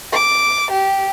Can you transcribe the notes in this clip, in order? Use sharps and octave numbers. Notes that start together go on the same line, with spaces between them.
D6
G4